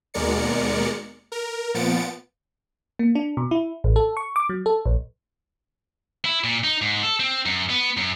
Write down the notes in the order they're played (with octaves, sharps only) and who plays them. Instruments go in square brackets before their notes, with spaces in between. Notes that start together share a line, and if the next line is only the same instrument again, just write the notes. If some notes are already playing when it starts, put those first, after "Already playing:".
[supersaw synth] D#2 B2 G#3 A#4 D5 C#7
A#4
A#2 F3 B3 A6 C#7 D7
[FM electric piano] A#3
D4
B2
E4
A1
A4
C#6
D6
F#3
A4
A#1
[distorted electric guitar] E4
A#2
D#4
G#2
A4
C4
F#2
B3
F#2